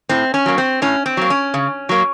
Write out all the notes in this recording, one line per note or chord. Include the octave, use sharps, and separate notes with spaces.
A2 C4
C#4
F#3 A#3
C4
A2 C#4
C4
F#3 A#3
C#4
C#3
F#3 A#3